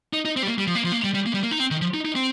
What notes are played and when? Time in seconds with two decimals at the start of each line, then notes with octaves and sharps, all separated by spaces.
0.13 D#4
0.25 D#4
0.36 C4
0.43 G3
0.48 A#3
0.58 G3
0.67 F3
0.75 A#3
0.84 F3
0.92 A#3
1.04 G3
1.14 G3
1.26 A#3
1.34 G3
1.43 A#3
1.51 D#4
1.60 C4
1.71 D#3
1.81 F3
1.94 D#4
2.05 D#4
2.15 C4